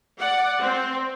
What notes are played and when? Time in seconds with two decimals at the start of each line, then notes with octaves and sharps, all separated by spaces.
0.18 D5 F#5
0.61 C4